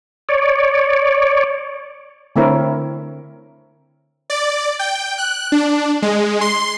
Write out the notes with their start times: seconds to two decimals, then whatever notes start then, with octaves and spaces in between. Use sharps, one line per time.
0.29 C#5 D5
2.36 D3 A3 C4 E4 A#4 C#5
4.30 D5
4.79 G5
5.18 F#6
5.52 D4
6.02 G#3
6.41 C6